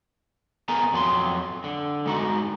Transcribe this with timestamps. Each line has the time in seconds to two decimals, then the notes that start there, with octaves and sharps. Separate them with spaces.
0.68 B3 G#4 A#4 G#5 A#5
0.93 F2 F#3 B5 C6
1.64 D3
2.06 G#3 D#4 F#4